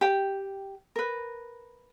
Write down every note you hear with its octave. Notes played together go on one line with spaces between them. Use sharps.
G4 G5
A#4 B4